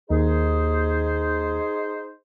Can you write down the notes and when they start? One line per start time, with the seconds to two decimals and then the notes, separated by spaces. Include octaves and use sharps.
0.10 D#2 D#4 G#4 C5